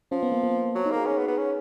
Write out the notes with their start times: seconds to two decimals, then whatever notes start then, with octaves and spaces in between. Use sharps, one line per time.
0.11 F3 C#4
0.23 B3
0.32 A#3
0.43 A#3
0.75 F#3
0.85 D#4
0.91 A#3 G#4
1.06 C#4
1.17 B3
1.28 B3
1.38 C#4